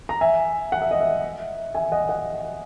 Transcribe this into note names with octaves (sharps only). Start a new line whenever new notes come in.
A#5
E5 G#5
F#5
E5
D#5
E5
E5 G#5
D#5 F#5
D#5 F#5